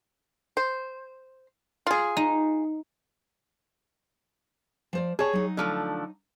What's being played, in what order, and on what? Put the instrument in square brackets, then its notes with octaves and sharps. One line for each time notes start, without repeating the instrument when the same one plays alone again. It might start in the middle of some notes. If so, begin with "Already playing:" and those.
[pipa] C5
F4 G#4
[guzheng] D#4
[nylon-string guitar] F3 C5 D5
[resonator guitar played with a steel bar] G#4 C#5 [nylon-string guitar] A5
[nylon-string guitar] F#3 D#4
[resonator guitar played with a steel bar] D3 F3 A3